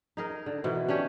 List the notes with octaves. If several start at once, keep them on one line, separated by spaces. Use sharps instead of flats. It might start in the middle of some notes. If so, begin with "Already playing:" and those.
D#4 G#4 A#4
D3
B2 D#3 E3
C#4 D4 G4 C#5